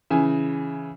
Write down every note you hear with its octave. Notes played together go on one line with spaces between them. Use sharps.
C#3 E3 G#5